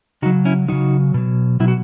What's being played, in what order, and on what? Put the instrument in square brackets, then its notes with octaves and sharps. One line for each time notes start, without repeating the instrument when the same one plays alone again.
[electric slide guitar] C#3 D#4 F#4
F#3
C#4 E4
C#3 F#3 D#4 F#4
B2 F#3
B2 F#3 E4
F#4